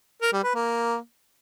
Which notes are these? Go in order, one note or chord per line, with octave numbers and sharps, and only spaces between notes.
A#4
G3
B4
A#3